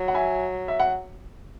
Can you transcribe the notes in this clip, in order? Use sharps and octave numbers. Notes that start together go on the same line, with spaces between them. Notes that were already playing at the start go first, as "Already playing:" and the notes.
Already playing: F#3
F#5
E5 G#5
E5
F#5